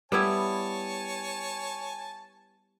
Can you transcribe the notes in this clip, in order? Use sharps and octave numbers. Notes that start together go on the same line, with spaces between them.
G3 B3 E4 C#5 G#5 A5